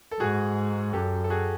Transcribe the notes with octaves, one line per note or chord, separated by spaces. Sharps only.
A4
G#2 F#4 G#4
F#2 G4 A4
A4
F#4 G#4